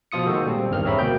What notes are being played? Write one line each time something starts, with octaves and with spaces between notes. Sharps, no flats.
B2 F3 F4 D#6 C#7
D#3 G#3 A#3 F#4 A4 C5
A#2 G3 C4
G#1 E2 G2 D#3 F6
C4 G#4 C#5 E5 A#5 B5
D2 B2 A#3 G5 G6